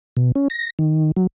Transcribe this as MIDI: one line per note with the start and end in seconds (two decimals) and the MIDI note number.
0.17 0.32 47
0.35 0.48 61
0.50 0.70 94
0.79 1.12 51
1.16 1.27 54